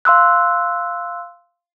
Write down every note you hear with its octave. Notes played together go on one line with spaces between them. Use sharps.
F5 C6 E6 F#6